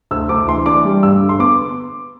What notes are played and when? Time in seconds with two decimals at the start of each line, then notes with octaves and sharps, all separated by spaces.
0.11 D2 E6
0.29 D2 D6
0.48 E3 C6
0.66 D4 D6
0.85 G3
1.03 G2 E6
1.22 D3
1.29 C6
1.39 B3 D6